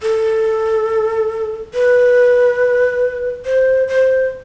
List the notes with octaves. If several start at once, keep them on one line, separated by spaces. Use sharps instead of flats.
A4
B4
C5
C5